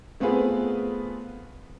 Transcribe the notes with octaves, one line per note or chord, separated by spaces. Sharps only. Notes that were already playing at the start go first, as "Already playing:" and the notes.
A3 B3 C4 F4 G#4 B4